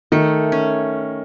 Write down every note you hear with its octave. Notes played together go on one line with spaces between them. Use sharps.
D#3 A3
C#4